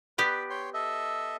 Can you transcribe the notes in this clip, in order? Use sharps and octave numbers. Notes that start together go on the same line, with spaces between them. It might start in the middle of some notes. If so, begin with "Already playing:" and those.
B3 G4 B4 D5
C#5 G5 C6
A4 D#5 E5